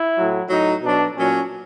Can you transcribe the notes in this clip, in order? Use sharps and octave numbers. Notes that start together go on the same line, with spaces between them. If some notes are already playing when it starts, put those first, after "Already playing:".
Already playing: E4
A2 F#3
A2 F#3 D#4
B2 F#3 D4
A#2 F#3 C#4